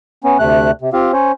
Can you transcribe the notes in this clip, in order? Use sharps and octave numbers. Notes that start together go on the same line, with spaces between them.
B3 C#4
D2 C3 A3 F#6
C3
C4 F4 G4 F5
C#4 C5 C#5